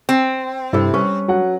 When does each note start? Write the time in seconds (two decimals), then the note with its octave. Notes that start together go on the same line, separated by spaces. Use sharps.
0.09 C4
0.73 G2 C3 E4 A4
0.94 G3 C#4 B4 C#6
1.28 F#3 F#5